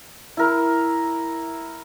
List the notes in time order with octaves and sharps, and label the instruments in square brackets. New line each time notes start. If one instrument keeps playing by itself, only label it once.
[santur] E4 A#4